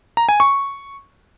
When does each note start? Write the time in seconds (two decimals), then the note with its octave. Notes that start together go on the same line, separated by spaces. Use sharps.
0.17 A#5
0.29 G#5
0.40 C#6